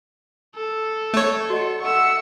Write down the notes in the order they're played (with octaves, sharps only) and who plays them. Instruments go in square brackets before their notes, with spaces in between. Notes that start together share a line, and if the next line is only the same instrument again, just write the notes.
[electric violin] A4
[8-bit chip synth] A3 C#5
[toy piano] F#4 D#5 [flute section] F#5 C6
[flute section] A4 E5 F#5 [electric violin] C#6 E6